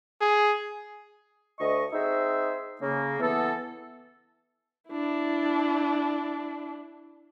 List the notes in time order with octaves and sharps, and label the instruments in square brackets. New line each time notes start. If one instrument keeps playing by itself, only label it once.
[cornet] G#4
[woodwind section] D2 D#5 C#6
C4 D#4 G#4 C5 E5
C#3 A#3
E3 B3 A4
[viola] D4 E4